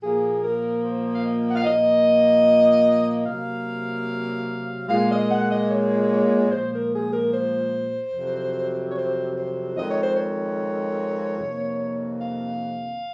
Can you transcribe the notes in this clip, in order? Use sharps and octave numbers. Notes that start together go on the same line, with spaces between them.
A#2 F3 A#3 G#4
A#4
C5
F5
D#5
F#5
F5
A#2 F3 A#3 D#5
C3 F#3 A#3 F5
A#2 G#3 F5
D#5
F#5
D#5
C#5
C#5
A#2 F3 G#3 C5
A#4
G#4
A#4
C5
F2 C3 F#3
C#5
C5
C5
F2 D#3 G#3 D#5
C#5
C5
C#5
F2 C3 D#3 A#3
F5